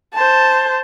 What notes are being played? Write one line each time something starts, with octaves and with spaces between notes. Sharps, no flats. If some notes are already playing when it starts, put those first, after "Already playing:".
C5 A5